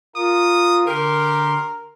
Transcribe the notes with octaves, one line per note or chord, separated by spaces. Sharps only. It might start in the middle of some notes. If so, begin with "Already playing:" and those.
F4 A#4 D#6
D3 G4 A#4 C6